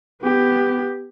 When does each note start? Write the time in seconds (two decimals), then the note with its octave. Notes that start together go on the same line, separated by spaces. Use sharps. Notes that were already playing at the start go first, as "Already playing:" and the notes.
0.22 B3 G4